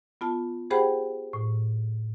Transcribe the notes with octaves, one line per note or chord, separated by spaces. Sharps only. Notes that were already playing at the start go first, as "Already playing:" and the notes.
B3 F4 A5
G4 G#4 C5 F#5 G5 B5
A2